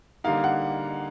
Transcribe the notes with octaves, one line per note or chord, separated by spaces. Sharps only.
D3 G3 A#3 D#4 F5
F#5